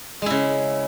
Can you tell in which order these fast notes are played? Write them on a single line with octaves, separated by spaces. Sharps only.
G#3 E4 C#3